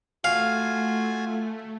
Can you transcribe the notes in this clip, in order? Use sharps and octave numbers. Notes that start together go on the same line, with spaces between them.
A3 F4 F#4 F5 G#5